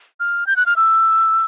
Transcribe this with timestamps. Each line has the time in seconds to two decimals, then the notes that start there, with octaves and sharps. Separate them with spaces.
0.20 F6
0.47 G6
0.56 F#6
0.66 F6
0.76 E6